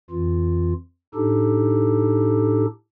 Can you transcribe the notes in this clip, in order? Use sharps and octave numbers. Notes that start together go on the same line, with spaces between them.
F2 E3 F4
A2 D4 D#4 G4 A4